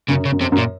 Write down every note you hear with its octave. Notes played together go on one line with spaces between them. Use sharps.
F#2 C#3
C#3
F#2
F2 C3
F#2
A#2